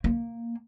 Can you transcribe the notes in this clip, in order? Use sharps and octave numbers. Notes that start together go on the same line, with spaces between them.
A#3